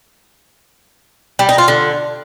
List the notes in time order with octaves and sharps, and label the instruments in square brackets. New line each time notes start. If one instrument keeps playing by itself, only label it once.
[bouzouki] G3
D#4
F4
D3